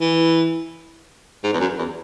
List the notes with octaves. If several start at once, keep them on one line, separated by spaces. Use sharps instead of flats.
E3
G#2
E2
F#2
E2